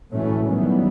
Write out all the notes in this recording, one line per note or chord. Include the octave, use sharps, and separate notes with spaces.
A2 E3 F#3 A3 C#4
D#3 E3 F#3 G3 B3